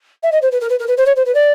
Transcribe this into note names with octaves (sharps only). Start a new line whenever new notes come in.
E5
D#5
C5
B4
A#4
B4
A#4
B4
C5
C#5
C5
B4
D5